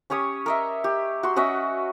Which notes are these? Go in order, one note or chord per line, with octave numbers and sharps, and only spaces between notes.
C#4 G4 C#5 D#6
A#4 D#5 E5
G4
F#4 C6
C#4 F#4 D#5 E5